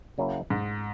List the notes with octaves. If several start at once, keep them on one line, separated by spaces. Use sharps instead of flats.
C#3 F#3 A#3 C#4 E4
G#2